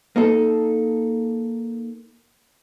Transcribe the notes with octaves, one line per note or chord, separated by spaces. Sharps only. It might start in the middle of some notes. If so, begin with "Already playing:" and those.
A#3 D#4 A4